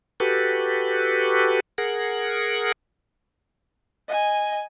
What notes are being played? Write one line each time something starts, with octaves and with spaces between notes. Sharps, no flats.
F#4 G4 A4 B4
G#4 A#4 F#5
D#5 G#5